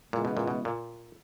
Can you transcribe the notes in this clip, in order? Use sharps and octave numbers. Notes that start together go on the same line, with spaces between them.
A#2 C#3 E3 G#3 B3
B2
A#2
B2
A#2